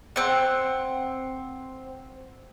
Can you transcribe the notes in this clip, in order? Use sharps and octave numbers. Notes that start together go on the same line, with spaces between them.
C4 F#5